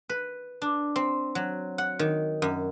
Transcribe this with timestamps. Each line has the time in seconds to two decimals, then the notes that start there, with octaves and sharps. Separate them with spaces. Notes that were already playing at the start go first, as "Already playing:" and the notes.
0.09 B4
0.62 D4
0.96 C4
1.35 F#3
1.78 F#5
1.99 D#3
2.42 F#2